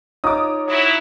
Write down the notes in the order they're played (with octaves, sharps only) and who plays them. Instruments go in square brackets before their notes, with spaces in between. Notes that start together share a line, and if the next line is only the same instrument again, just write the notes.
[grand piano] D#4 F4 A#5 [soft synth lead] C#5 [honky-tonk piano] D6 D#6
[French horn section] F#3 E4